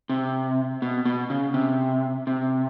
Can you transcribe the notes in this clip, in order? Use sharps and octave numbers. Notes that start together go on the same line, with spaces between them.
C3
B2
B2
C#3
C3
C3